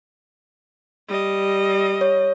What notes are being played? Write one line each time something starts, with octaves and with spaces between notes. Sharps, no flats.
G3 D#5
C#5